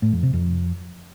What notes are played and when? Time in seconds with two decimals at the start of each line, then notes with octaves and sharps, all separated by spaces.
0.02 A2
0.13 F2
0.23 C3
0.33 F2